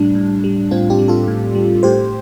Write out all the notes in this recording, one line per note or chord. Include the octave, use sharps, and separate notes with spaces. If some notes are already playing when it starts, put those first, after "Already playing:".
Already playing: A2 G3 D4
A2
G3
A2 C4 F4
D4 G4
G3
F4 A4
A2
G3
A2 G4 C5